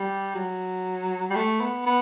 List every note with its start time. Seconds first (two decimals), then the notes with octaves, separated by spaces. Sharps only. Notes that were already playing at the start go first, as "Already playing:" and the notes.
Already playing: G3
0.35 F#3
1.30 G3
1.35 A3
1.61 B3
1.86 B3